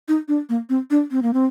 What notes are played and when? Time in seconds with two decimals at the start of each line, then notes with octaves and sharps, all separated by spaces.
0.08 D#4
0.28 D4
0.49 A#3
0.69 C4
0.91 D4
1.11 C4
1.22 A#3
1.34 C4